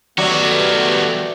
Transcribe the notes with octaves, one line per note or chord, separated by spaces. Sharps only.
D#3 F#3 G3 A3 B3 F#4 D5 E5